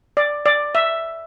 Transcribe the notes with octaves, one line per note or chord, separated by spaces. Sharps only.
D5
D5
E5